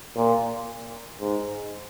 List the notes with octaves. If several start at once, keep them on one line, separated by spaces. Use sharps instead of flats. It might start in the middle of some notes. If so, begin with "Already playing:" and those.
A#2
G#2